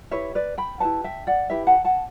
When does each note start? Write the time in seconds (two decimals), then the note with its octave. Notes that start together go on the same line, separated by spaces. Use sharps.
0.11 E4 G4 B4 C#5 E5
0.35 B4 D5
0.58 G5 B5
0.80 E4 G4 B4 F#5 A5
1.04 E5 G5
1.27 D5 F#5
1.50 E4 G4 B4 E5 G5
1.67 F#5 A5
1.84 F#5 A5